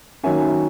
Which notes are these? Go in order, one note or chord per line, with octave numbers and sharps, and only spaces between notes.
D#3 F#3 A#3 C#4 E5 G#5